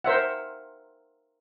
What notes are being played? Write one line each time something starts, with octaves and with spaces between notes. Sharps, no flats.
A#4 C5 E5 F#5